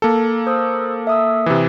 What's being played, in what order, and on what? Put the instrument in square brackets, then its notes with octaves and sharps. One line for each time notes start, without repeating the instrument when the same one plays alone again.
[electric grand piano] A#3 A4
[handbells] C5 D#6 E6
E5 D#6 E6
[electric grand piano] C3 E3